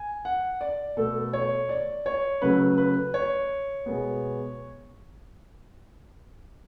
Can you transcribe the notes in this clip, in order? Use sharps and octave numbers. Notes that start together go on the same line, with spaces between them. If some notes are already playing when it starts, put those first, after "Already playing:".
Already playing: G#5
F#5
D5
B2 A3 A4
C#5
D5
C#5
C#3 F#3 A3 B4
B4
C#5
B2 G#3 B3